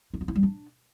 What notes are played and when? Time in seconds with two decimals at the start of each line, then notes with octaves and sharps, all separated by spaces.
0.14 E4
0.21 F4
0.28 E4
0.36 G3
0.43 D4